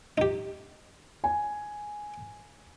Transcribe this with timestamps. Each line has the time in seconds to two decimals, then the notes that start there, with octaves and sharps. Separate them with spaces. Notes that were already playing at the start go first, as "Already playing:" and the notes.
0.18 D#4 G4
1.24 G#5